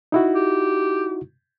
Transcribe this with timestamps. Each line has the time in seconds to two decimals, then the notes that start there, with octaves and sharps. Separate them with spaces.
0.12 D#4 E4 F#4
0.35 G4